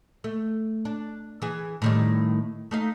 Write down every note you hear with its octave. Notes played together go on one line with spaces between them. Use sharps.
A3
D4
E3 G#4
A2 D#3 G3
A3 D#4 F5